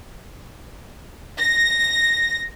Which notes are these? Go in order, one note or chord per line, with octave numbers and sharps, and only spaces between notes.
A#6